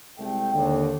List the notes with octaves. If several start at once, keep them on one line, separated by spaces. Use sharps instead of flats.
C2 G#3 A3 G5
D#2 D3